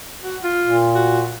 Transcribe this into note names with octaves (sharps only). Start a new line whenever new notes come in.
F#4
F4
A#2
F#4